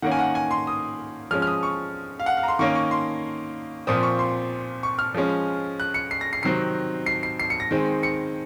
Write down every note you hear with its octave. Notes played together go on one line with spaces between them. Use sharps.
D#3 A#3 C#4 F#5
G#5
F#5
G#5
C6
D#6
F3 G#3 C#4 F6
F6
D#6
C#6
F5
F#5
F5
A#5
C6
D#3 A#3 C#4 C#6
C#6
C6
A#2 F3 C4 D#6
C#6
C6
C#6
F6
F3 G#3 C#4
F#6
C#7
C7
A#6
C7
C3 D#3 F#3 C4 C7
C7
C7
C7
C#7
A#6
D#3 G#3 C4
C#7